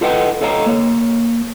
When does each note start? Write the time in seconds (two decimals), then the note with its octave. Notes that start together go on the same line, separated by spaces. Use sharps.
0.01 F4 A4 B4 D#5 F#5 G5
0.41 A4 C#5 D#5 F5 G5 A#5
0.66 A#3 C#5